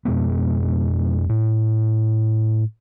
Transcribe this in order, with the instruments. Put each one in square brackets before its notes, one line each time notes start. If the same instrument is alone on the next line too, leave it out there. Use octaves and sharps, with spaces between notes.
[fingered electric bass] F2 B2 G#3 B3
A2